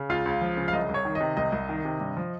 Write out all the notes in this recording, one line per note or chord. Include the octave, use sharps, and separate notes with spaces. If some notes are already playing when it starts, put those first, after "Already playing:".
Already playing: C#3
C#2 F4 F5
C#2
F3
C#3
F5
C2 D#5
C2
C#5
D#3
D#5
C3
C2 D#5
C2
D#3
C3
G2
F3